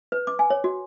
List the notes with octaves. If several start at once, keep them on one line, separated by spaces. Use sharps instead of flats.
B4
D6
G#5
C#5
F#4